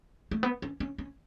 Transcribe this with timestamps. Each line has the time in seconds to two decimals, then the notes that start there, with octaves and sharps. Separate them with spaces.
0.31 A3
0.43 B3
0.62 C#4
0.80 C#4
0.98 C#4